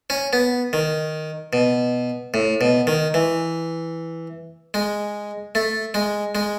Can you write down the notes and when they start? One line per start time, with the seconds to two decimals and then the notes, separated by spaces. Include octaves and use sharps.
0.10 C#4
0.33 B3
0.73 D#3
1.53 B2
2.34 A2
2.61 B2
2.87 D#3
3.14 E3
4.74 G#3
5.55 A3
5.94 G#3
6.35 G#3